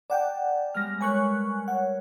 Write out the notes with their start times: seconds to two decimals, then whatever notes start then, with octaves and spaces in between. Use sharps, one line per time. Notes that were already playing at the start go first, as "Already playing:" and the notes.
0.10 D5 F#5 G5 A5
0.75 G3 G#3 B3 F6 A#6
1.01 A#4 B4 C#5 G#5 C#6 F#6
1.68 C#5 F#5